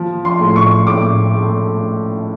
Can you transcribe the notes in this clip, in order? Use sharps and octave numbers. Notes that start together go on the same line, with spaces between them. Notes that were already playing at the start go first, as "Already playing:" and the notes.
Already playing: F3
C6
A2
C#6
A2 D6
A3